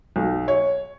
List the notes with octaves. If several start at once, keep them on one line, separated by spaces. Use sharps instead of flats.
B1
C#5